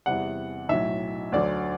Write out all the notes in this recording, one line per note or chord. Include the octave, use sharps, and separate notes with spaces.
E2 C3 G3 F#5
B1 A2 F#3 E5
D2 D3 F#3 D5